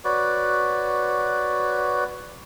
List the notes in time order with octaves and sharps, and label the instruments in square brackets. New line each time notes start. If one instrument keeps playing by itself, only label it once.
[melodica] F#4 B4 C#5 D5